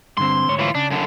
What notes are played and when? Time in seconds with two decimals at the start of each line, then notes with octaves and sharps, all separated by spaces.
0.17 G2 D3 C4 C6
0.47 D2 G#2 C#5
0.59 E3 F4
0.75 C#3 D4
0.90 F#2 D3